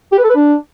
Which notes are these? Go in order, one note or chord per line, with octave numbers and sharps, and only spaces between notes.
G4
B4
A4
B4
D4